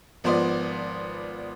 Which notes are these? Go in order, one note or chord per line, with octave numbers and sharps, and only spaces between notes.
G#1 F3 B3 C5 D5